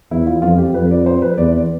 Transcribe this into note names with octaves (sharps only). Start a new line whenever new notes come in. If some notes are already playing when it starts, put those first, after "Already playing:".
E2 E4
F4
F2 F4
G4
F2 B4
D5
C5
B4
E2 D5